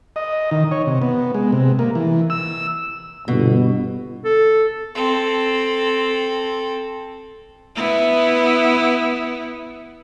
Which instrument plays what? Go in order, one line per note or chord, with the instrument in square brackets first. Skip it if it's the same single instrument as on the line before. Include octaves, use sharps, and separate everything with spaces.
[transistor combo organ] D#5
D#3
C#5
C3
B3
G#3
C3
A#3
E3
E6
[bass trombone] G1 [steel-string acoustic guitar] B2
[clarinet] A4
[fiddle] C4 A4
[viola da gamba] B3 E4